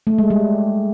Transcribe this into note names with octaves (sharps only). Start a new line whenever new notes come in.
A3
G#3
G3